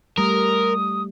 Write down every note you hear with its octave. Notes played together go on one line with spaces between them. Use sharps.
G3 A3 A#4 D#6